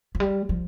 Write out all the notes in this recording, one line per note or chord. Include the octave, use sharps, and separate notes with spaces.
F3
G3
F3